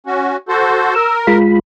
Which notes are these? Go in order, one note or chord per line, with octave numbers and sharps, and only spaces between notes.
C#4 F#4
F#4 A4 C5
A#4 E6
G#3 F4 B5